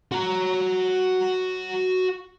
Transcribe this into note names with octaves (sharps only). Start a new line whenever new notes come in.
F#4 A#5